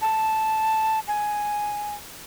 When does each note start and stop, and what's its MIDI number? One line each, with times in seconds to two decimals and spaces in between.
0.02 1.00 81
1.08 1.95 80